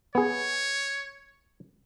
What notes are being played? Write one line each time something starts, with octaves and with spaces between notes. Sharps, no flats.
B3 G#4 C#5